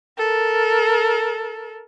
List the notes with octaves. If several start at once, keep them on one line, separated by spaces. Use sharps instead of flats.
A4 A#4